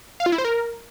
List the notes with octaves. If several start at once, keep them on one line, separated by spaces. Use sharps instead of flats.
F5
F4
E4
C5
A#4